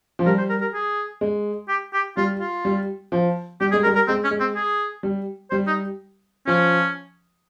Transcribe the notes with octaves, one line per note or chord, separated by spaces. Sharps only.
F3
G3 A#4
C5
A#4
A#4
G#4
G#3
G4
G4
G3 F4
F4
G3
F3
G3 G4
G#3 G#4
A#4
G3
A#4
G#3 C4
C#4
G#3
C4
G#4
G3
G3 C5
D#4
F3 C#4